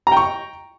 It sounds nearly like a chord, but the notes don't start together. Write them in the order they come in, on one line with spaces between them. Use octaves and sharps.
A#5 G5 C#6